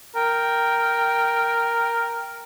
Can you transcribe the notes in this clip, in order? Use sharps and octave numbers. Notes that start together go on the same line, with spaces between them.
A#4 G5